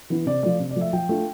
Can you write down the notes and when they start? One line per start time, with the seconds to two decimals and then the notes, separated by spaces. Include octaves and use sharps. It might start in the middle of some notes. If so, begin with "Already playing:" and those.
0.10 E3 B3 E4
0.26 C3 D5
0.43 F3 A3 D5
0.60 C3
0.71 D5
0.76 F3 A3
0.81 E5
0.93 F3 G5
1.09 A3 D4 F4